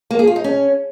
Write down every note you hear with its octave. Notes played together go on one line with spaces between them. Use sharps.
A#3
G#4
F4
D#4
C#4